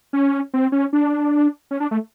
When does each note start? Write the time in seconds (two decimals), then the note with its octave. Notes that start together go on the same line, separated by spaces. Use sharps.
0.13 C#4
0.54 C4
0.72 C#4
0.93 D4
1.71 C#4
1.80 D4
1.91 A3